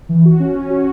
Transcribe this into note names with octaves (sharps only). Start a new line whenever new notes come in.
E3
F#4
C#4
C#4
F#4